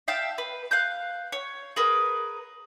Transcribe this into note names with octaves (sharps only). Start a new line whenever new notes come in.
E5 F5 G5 A5
B4
F5 F#6 G6
C#5
G#4 A#4 B4